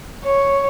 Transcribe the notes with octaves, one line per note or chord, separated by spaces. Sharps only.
C#5